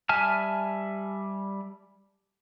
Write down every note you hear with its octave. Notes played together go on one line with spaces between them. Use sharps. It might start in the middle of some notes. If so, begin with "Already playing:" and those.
G3 E5 G#5 A5 F6